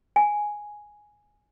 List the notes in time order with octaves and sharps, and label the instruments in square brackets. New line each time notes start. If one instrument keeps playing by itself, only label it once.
[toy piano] G#5